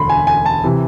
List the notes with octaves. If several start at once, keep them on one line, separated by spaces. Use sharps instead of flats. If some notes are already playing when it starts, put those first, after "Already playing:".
Already playing: E1 D2 B5 C6
G#5
G#5
A5
C3 E3